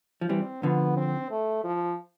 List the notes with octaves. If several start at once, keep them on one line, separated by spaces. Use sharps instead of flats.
F3
E3 G3 C4
D3 F3 B3
C4
A3
F3